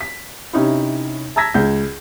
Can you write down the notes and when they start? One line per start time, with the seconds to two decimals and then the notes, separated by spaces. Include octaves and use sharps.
0.01 B6
0.53 C3 C#4 D#4 E4
1.36 A5 A#5 E6 G#6 A#6 B6
1.54 C#2 G6